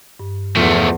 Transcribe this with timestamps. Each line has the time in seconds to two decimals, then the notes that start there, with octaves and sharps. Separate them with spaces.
0.20 G2
0.57 E2 F3 A3